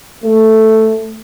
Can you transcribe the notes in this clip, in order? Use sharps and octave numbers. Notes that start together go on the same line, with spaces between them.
A3